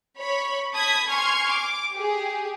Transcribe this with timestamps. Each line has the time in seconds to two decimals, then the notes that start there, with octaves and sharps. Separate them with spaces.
0.17 C#5 B5 C#6
0.74 A5 B5 D#6 G#6 B6
1.10 G#5 C6 C#6 F6 G#6
1.50 D6
1.94 G4 G#4